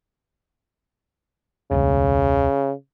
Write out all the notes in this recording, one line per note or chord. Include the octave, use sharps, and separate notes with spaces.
E1 C#2 C#3